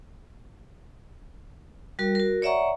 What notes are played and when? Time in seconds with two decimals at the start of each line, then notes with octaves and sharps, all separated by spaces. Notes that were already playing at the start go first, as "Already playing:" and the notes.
1.99 G3 F#4 A#4
2.15 F#4 A#4
2.42 C#5 D5 E5 F#5 A#5 C#6